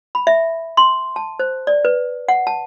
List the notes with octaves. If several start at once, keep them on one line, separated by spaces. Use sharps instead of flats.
B5
E5
C6
A5
C5
D5
B4
F#5
A5